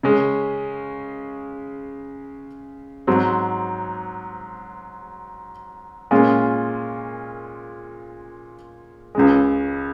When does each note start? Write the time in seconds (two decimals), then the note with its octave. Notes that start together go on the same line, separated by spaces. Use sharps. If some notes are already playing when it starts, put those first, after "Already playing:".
0.03 C#3 G#3 C#4
3.07 G#2 F#3 C4
6.11 A#2 G#3 C#4 F4
9.15 C#2 C#3 G#3